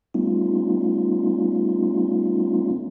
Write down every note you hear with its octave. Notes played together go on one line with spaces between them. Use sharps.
G3 A3 B3 C#4 D#4 F4